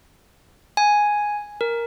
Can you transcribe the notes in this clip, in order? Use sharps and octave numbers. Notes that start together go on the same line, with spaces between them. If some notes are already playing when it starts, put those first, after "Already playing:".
G#5
A#4